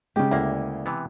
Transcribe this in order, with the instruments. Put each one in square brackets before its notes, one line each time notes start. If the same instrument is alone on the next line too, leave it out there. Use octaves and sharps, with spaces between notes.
[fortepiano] C#3 G#3 [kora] G4
[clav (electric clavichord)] D2 A#3 [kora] E4
[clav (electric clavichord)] C3 E3 B3